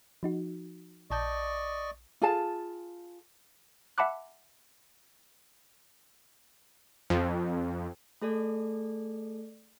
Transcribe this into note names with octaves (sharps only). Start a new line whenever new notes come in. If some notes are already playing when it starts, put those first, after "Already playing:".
F3 D#4 F#4
A#1 D5 D#5 A5 C#6 G6
F4 G#4 A5
E5 F#5 A5 B5 D6 F#6
F2
A3 G#4 A4 D5